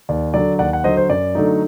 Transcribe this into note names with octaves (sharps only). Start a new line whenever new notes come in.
D#2 D5
D3 F#3 D5
D#2 D5 F#5
F#5
D3 F#3 C5 D#5
C5
F#2 D5
D3 F#3 A3 D#4